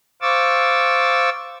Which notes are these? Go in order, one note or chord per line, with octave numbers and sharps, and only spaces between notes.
C5 F5 C#6 D6 E6 A6